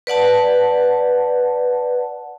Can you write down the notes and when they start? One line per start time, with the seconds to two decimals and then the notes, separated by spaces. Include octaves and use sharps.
0.07 B4 D5 F#5 A5